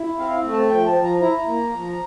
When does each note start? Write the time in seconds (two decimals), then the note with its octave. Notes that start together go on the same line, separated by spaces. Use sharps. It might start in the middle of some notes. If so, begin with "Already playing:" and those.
Already playing: E4
0.18 C4 F5
0.43 A3
0.53 A5
0.69 F3 G5
0.87 A5
0.96 F3
1.04 A#5
1.21 E4 A#5
1.46 A#3
1.72 F3